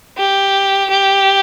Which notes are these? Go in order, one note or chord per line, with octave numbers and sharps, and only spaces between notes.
G4
G4